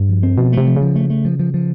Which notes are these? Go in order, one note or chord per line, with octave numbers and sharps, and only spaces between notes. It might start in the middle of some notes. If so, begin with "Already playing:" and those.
Already playing: G2
F3
C4
B2 F3
A3
C3
F3
C#3
F3
A3
A3
F3
F3
F3